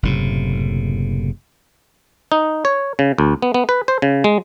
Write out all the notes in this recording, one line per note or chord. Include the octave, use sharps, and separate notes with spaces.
F#1 A2 C3
D#4
C#5
C#3
D2
B3
B3
B4
C5
C#3
G#3